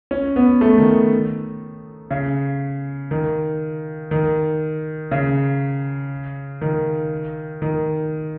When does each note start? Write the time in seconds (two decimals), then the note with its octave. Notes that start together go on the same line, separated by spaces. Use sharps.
0.11 C#4
0.36 B3
0.61 A3
0.78 D#3
2.11 C#3
3.11 D#3
4.11 D#3
5.11 C#3
6.61 D#3
7.62 D#3